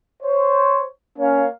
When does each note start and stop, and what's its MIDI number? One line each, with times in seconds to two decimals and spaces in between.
0.23 0.83 72
0.23 0.83 73
1.19 1.47 58
1.19 1.47 61
1.19 1.47 73
1.19 1.47 77